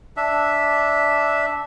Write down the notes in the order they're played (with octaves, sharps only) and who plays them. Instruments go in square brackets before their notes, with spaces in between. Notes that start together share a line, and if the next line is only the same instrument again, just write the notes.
[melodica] D4 E5